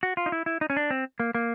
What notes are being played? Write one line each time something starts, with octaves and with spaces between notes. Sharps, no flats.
F#4
F4
D#4
E4
E4
D#4
C#4
D4
C4
A#3
A#3